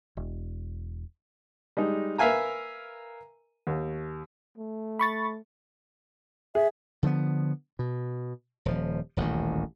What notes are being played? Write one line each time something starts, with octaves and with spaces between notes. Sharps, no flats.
E1
G3 G#3 D#4
A#4 B4 E5 F5 G#5 A#5
D#2
A3
B5 C#6 A6
G#4 E5
D3 F3 G#3 B3
B2
D#1 F3
D#1 A1 D2 D#3